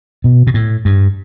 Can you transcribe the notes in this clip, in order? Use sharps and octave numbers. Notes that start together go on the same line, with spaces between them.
B2
B2
A2
G2